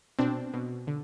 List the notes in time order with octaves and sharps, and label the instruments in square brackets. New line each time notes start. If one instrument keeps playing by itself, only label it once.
[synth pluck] B2 C4 D4
B2
D3